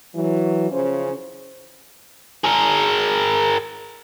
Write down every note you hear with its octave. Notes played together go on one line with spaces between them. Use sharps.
E3 F#3
C#3 F3 C#4 C5
G#4 A#4